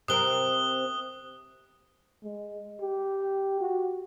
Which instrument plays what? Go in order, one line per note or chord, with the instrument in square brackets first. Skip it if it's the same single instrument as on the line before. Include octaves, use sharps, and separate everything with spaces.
[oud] C3 C4 A#4 [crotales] D#6 F#6 G7
[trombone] G#3
G4
F#4